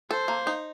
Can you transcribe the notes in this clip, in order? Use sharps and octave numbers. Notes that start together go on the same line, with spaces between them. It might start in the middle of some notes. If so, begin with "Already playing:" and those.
A4 C5
A#3
D#4